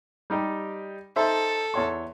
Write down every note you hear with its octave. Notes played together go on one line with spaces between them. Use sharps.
G3 D#4 G4
D#4 A4 C5 E5
E2 C#5 C6